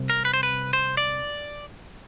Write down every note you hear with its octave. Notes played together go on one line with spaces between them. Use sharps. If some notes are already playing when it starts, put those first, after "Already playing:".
Already playing: C2 C3
A#4
B4
C5
B4
C5
D5